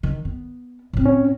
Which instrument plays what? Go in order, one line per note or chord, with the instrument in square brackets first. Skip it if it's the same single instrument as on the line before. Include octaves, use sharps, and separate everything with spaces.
[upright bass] D#3
B3
A2 C4
[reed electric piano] C#4